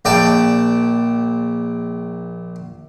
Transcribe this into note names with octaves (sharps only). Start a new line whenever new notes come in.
A#1 D5 G5 A5